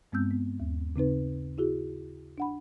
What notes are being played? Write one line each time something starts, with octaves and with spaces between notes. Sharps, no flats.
G2 G#3 B3 C4 E6 G6
B3
D#2
C#3 C4 D#4 B4
E4 F#4 G#4
D4 F#5 B5